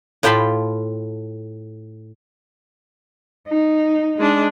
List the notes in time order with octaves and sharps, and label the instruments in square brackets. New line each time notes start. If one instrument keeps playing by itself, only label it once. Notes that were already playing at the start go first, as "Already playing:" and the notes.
[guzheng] A2 F4 G5 A5 B5 C6
[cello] D#4
[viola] G#3 D4